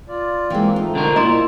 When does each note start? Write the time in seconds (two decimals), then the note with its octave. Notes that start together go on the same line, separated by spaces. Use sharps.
0.09 F4 D5
0.50 E3 G#3 A#3 C4
0.76 A3 C4 D#4 F4
0.95 D3 D#4 F#4 A#4 C5
1.16 A#2 A#3 E4 D#5 A#5 C6